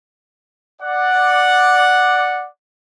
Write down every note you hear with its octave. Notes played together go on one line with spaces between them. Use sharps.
D5 F#5